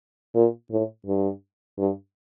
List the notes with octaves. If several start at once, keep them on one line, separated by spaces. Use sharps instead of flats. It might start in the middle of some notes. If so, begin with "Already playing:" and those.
A#2
A2
G2
G2